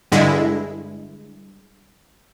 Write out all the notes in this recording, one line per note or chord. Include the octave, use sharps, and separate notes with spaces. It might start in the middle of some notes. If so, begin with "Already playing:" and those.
G2 D3 G#3 E4